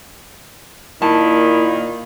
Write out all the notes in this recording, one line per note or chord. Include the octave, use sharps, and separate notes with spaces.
A#2 D#3 E4 A5